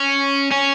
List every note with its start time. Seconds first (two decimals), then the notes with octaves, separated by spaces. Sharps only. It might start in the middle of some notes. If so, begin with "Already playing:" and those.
Already playing: C#4
0.52 C#4